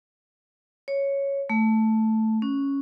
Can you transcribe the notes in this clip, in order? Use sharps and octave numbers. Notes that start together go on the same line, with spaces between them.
C#5
A3
C#4